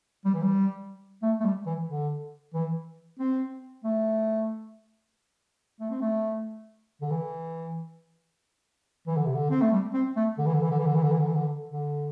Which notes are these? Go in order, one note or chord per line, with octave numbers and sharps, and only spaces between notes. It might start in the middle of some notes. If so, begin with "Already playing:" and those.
G3
E3
G3
A3
A3
G3
E3
D3
E3
C4
A3
A3
C4
A3
D3
E3
E3
D3
C3
D3
C4
A3
G3
C4
A3
D3
E3
D3
E3
D3
E3
D3
E3
D3
E3
D3
E3
D3
D3